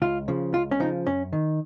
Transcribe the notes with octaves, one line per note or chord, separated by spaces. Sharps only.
C#2 F4
C#3 F3
C#2 F4
C#4
C#3 F3 D#4
F#2 C#4
D#3